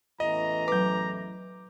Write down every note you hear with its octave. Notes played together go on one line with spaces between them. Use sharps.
A1 E2 E3 D#5 A#5
F#3 B4 D6 G6